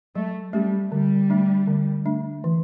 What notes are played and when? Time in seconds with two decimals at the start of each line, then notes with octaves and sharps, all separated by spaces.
0.15 F#3 A3
0.53 G3 A3 C#4 G4
0.92 D3 G3
1.30 A3 D4
1.67 D3
2.05 A3 D4
2.44 E3